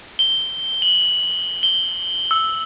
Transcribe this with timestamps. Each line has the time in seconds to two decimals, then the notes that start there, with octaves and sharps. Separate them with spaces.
0.19 G7
0.82 F#7
1.63 G7
2.31 E6